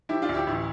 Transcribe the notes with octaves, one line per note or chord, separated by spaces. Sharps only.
F3 E4 G4
D4 F4
D2
E4 G4
A1 E4